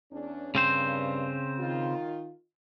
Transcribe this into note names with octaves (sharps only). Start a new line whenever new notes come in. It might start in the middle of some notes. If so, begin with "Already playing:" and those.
E2 C#4 D4
G2 C#3 C4 C5
D#3 F4